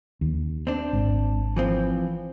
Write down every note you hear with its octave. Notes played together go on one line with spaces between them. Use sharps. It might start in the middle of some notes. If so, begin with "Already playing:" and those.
D#2
C4 D4
G#1
E3 F3 C4